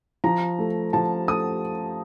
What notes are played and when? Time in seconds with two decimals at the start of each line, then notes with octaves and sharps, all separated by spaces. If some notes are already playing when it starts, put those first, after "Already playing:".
0.24 F3 A#5
0.59 A3
0.93 F3 A5
1.28 A3 D#6